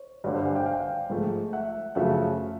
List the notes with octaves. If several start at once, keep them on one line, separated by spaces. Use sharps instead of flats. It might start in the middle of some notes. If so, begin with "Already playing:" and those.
Already playing: C5 C#5
G2 D3 G3 B4 C#5
C5 D5
F#5 G#5
F5 G5
F5 G5
G#2 F3 A3
E5 F#5
F#2 C#3 F3 A3 E5 F#5